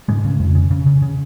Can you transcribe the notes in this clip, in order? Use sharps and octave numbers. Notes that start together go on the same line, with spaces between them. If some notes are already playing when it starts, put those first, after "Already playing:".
G#2 C#3 G#3
C#3
F2
C#3
C#3
C#3
C#3